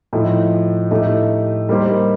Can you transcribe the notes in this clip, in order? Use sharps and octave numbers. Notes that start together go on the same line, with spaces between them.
A2 F3 A3 D#4
A2 A3 D#4 G4
G3 A#3 D#4 G4 C5